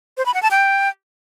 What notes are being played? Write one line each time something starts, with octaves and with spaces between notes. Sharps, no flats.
C5
B5
F#5
A5
G5